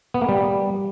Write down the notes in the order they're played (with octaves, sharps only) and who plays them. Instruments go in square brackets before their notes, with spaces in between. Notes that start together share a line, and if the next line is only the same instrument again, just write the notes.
[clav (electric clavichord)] B3
A#3
G3